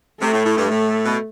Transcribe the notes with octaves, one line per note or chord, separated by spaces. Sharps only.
C3 A3
A2
A2
G2
A2 A3
B2